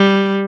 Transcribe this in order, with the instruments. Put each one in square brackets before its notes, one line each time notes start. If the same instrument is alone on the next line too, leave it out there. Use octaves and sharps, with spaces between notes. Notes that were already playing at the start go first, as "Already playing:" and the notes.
Already playing: [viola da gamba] G3